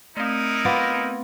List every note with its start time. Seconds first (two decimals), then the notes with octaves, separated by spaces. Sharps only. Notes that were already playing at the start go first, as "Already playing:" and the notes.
0.17 A3 C4 D#4 E4 A#4
0.65 B3 F4 D5